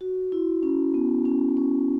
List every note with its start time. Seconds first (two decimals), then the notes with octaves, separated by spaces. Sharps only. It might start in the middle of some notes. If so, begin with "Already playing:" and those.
0.01 F#4
0.32 E4
0.63 C#4
0.94 B3
1.25 C#4
1.57 C#4